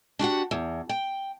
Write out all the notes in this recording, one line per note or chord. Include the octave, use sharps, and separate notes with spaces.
D4 F#4 G4 F#5
E2
G5